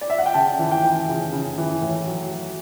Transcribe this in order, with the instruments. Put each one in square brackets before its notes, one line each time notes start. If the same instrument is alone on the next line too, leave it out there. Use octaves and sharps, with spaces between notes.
[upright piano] D5
E5
F#5
G5
C#3 A5
E3
G5
E3
C#3
C#3
E3
A2
F#3
F#3